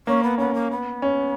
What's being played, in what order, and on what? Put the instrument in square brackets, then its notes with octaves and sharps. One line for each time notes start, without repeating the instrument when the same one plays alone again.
[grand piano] A#3 [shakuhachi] C#4
[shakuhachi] B3
[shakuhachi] B3 [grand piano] C#4
[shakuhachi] A#3
B3
[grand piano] C#4